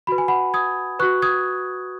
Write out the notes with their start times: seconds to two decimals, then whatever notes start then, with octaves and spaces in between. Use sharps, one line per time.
0.07 F#4 B4 B5
0.18 G#5
0.28 F#5 B5
0.54 D#6 G#6
0.99 F#4 B4 C#6 F#6
1.22 D#6 G#6